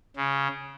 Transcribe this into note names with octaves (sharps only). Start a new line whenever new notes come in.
C#3